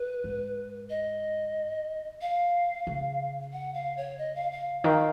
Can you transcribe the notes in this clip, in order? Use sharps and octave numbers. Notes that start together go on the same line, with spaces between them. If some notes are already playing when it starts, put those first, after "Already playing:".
Already playing: B4
G#2
D#5
F5
C#3
F#5
F5
C#5
D#5
F5
F5
D#3 F5